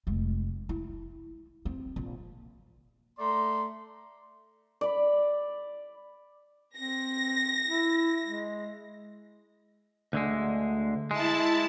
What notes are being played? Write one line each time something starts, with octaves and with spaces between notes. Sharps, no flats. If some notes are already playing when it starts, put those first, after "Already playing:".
F1 G#3
E4
C4
A#1
A3 D5 A#5 C6
D5 B5
C4 A#6
E4
G#3
D2 D3 G#3
G#3 E4 A5